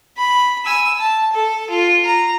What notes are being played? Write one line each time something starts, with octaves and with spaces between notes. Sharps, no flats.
B5
G#5 E6
A5
A4
F4
A#5